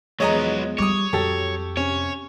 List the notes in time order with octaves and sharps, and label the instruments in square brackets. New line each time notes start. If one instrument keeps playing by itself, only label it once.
[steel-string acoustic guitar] E2 F3 G#3 [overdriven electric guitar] F#3 B3 [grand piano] C#5 D#5 A#5
[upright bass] G3 [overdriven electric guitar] C#5 [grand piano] D6 D#6
[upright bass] F2 [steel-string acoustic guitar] F#3 [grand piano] G4 A4 A5
[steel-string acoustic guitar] C3 [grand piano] C#4 [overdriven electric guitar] C#5